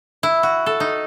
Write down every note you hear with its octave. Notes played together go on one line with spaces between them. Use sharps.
E4
F#4
A4
D#4